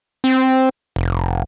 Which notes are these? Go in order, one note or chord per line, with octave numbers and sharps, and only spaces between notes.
C4
F1